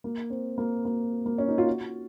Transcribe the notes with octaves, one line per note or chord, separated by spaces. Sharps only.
A#3
C4
A#3
A#3
A#3
C#4
D#4
F4
F#4